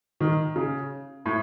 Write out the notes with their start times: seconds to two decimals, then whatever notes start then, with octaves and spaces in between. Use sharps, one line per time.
0.20 D#3
0.56 C#3
1.26 A2